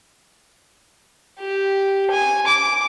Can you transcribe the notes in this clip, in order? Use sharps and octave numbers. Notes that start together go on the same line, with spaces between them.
G4
G#5
D6